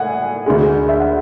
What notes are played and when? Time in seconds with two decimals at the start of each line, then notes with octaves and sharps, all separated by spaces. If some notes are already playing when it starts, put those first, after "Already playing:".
Already playing: A2 F#5 G#5
0.46 D2 D3 G#3
0.89 E5
1.00 F#5